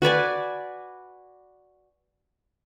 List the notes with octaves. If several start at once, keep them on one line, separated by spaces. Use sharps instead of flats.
F#4 B4 D5 G#5